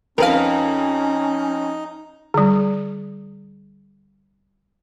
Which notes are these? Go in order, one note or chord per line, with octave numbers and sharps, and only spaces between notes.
F2 C#4 D#4 A#4 B4 F5
D3 G3